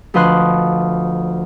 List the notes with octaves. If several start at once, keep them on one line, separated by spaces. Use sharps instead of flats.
D2 F3 B4 D#5 C6 F#6